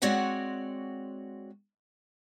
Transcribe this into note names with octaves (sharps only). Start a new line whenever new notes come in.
G#3 C4 F#4 C#5 D5 F#5